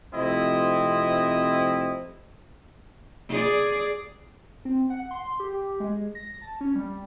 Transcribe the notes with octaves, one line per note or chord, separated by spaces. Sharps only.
C3 F3 A3 C4 E4 D#5
G#4 D5
C4
F#5
C6
G4
G#3
A#6
A5
C#4
G3